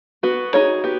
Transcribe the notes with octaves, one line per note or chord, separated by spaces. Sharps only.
B3 F#4
D#4 G#4 C#5
B3 G4